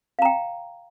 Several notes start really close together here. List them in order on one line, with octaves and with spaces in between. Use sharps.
F5 A#5 G5